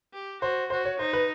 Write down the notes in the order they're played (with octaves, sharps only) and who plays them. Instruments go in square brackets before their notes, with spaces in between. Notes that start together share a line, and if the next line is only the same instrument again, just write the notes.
[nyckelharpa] G4
[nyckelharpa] F#4 [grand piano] C5
[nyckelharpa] F#4 [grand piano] C5
[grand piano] C#5
[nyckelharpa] D#4 [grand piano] C5
[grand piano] B4